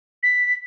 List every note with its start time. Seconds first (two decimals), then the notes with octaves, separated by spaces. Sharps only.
0.23 B6